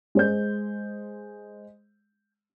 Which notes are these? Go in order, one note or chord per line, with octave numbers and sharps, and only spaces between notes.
G#3 C5 G6